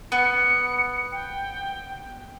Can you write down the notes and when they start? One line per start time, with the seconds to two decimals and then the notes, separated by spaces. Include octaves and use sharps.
0.12 B3 C#7
1.12 G5